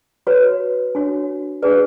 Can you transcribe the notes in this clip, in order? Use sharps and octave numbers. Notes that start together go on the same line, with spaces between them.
F#4 B4 C#5
D4 F#4 C#5
D4 G#4 B4 D5